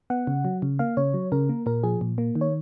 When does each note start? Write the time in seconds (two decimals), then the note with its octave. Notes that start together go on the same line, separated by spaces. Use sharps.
0.10 B3 F#5
0.27 C#3
0.45 F#3
0.62 C#3
0.79 A#3 F5
0.97 C#3 C#5
1.14 F#3
1.32 C#3 A#4
1.49 A#3
1.66 A#2 A#4
1.84 F3 G#4
2.01 A#2
2.18 A#3
2.35 D#3
2.41 C#5